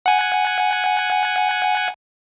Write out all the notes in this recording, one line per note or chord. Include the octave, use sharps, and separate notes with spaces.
F#5 G#5